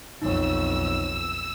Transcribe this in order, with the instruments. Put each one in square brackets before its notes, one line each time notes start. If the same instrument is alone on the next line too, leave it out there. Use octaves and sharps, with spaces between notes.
[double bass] B1 F2 [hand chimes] D#4 C#5 [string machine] E6